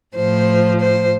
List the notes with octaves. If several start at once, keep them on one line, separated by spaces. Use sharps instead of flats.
A2 F3 C5
C5